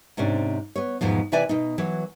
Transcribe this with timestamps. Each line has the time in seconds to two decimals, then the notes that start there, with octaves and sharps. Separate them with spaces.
0.17 G#2 C3 C#4 D4
0.76 B3 C#5
1.01 E2 G#2 B2 F3
1.32 C3 E3 B4 D5 E5 G#5
1.49 B2 D#4
1.78 E3 F#3